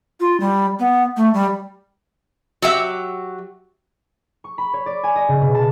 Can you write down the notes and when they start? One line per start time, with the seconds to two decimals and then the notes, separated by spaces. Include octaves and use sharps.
0.20 F4
0.40 G3
0.79 B3
1.17 A3
1.34 G3
2.62 F#3 G4 E5
4.44 C#6
4.58 B5
4.74 C#5
4.86 D5
5.03 G#5
5.16 D#5
5.28 C#3
5.41 B2
5.55 A5